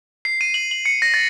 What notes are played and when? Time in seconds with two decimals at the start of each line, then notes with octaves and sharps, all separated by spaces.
0.25 C7
0.41 D#7
0.54 F#7
0.71 F#7
0.86 C#7
1.02 A#6
1.14 A6